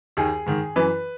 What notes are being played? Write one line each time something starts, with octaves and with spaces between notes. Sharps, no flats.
D#2 D#3 G#4
G#2 D#3
F#2 E3 B4